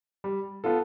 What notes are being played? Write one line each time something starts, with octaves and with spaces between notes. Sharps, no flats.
G3
B3 F4 A4